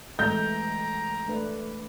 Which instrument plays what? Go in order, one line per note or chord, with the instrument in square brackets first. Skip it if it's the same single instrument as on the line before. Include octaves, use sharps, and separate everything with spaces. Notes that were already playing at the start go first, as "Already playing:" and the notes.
[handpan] E3 G#3 A3 [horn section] G5 A#5 [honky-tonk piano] G6
[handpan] A3 D4 B4